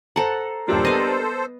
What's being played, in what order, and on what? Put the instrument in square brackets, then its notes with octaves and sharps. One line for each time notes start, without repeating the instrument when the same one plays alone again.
[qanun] A4 F#5 [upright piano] C5 A5 A#5
[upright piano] D#1 F3 [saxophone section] A#3 D4 G4 [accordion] A4 C5
[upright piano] B3 [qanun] D#5 F5